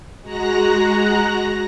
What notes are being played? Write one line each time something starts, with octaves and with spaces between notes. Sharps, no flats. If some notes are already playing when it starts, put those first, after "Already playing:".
G#3 F#4 A#5 F#6 A#6